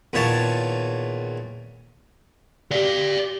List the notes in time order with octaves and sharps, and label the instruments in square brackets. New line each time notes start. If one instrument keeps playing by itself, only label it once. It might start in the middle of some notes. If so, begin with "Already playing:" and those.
[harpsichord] E2 A#2 D#3 C#5 A5
[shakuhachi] G4 [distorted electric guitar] D5 F5